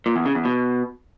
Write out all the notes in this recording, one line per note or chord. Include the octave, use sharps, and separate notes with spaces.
A#2
E2
C#3
E2
B2